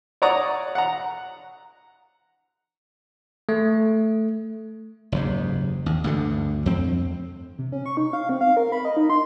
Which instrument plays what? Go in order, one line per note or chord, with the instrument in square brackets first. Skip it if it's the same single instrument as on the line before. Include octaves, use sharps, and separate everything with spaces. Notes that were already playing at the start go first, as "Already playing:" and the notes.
[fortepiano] C#5 D5 F#5 A#5 C#6 D#6
F#5 A#5
[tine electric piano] A3
[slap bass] F#1 D#2 G#2
D#2
D2 G2 D3
F2 C4
[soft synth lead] C3
C#4
C#6
D#4
F5
C4
F5
A#4
B5
D#5
D#4
C6